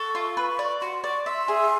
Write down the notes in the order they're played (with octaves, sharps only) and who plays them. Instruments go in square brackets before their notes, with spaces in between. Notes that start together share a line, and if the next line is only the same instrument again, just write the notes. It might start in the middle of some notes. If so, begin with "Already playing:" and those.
Already playing: [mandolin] A4 [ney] C#6
[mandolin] F4
B4
D5
[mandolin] F#4 [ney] C6
[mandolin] D5 [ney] C#6
[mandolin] E5 [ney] C6
[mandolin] G#4